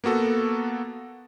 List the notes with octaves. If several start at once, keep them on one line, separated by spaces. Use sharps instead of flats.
A#3 B3 F#4 A4